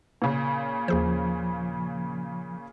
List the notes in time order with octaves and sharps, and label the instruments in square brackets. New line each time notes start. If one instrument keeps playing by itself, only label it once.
[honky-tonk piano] A#2 C#3
[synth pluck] D#2 G#4 C5 [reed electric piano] F3